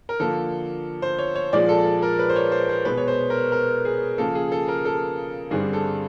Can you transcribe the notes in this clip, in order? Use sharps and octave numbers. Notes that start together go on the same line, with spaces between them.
A#4
D3 F3 A#3 A4
C5
C#5
C#5
A#2 F3 G#3 D5
A4
A4
A#4
B4
C5
C#5
C5
C5
B2 G#3 B3 B4
C#5
C5
A#4
A#4
G#4
C#3 F3 A#3 A4
G#4
A4
A#4
A4
G2 D3 G3 C4 G#4
A4